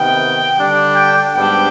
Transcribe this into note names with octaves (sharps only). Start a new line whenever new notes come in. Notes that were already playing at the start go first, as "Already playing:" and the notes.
Already playing: C3 D#3 B3 G5
D3 G3 D4
G5
G#2 G3 B3 D4 G5